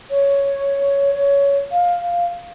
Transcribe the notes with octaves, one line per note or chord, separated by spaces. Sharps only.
C#5
C#5
F5